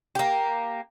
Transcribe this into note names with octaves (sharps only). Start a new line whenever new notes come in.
A#3 G4